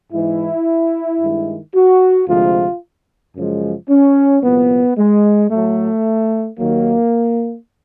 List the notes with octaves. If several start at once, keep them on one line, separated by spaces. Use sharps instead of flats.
G#2 E3 G#3 E4
G2 D#3 G#3
F#4
D2 C3 F3 G#3 F4
F#2 C#3 F3 G#3
C#4
C2 A#2 F3 B3
G#3
A2 F#3 A3
D#2 D#3 F#3 A#3